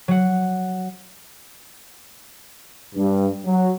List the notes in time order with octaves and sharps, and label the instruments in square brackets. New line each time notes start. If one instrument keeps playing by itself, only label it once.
[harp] F#3 F#5
[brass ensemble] G2
F#3